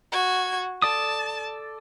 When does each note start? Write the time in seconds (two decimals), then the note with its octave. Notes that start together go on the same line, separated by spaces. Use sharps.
0.12 F#4 G#6
0.82 A4 D5 A5 D#6